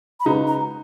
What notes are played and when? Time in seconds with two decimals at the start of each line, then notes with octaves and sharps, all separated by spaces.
0.20 B5
0.25 C#3 G#3 D#4 F#4 B4 A#5
0.47 A#5